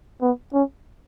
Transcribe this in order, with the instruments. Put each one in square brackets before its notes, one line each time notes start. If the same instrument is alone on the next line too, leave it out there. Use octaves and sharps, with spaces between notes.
[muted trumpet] B3
C#4